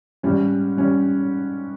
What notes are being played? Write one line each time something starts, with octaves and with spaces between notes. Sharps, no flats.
G#2 G3 C#4
G3 C#4